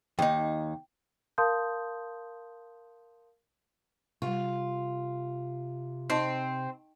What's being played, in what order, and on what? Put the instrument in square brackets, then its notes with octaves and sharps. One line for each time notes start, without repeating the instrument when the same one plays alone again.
[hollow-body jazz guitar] D#2 D#4 [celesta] G5
[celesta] A#4 F5 A5 C6 D#6 G6
[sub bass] C3 [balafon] G3 C#6 [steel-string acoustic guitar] F4
[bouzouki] C4 [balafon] D#4 D#5 A5